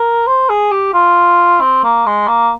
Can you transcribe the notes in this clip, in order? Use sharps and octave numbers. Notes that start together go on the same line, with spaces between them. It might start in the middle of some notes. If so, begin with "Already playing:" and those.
Already playing: A#4
C5
G#4
G4
F4
C4
A#3
G#3
A#3